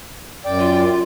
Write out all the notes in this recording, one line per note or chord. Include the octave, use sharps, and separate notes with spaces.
F#2 D5 G5
F4